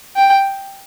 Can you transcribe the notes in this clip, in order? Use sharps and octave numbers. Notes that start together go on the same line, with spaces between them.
G5